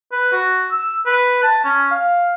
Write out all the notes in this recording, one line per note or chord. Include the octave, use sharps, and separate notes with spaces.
B4
F#4
E6
B4
A5
C#4
F5